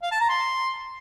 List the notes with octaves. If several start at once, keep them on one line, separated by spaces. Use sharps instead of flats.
F5
A5
A#5
C6